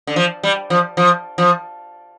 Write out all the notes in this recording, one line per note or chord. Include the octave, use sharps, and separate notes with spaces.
D3
F3
G3
F3
F3
F3